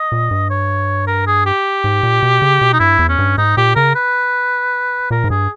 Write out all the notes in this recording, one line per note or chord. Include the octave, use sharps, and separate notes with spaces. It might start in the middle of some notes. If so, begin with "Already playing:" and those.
Already playing: D#5
A#2
G2
C#5
A#4
G#4
G4
G#2
A#2
B2
C#3
B2
D#4
G2 E4
E2
C#4
G2
G#2 D#4
A#2 G4
C#3 A#4
B4
A#2 A#4
G#2
G2 G#4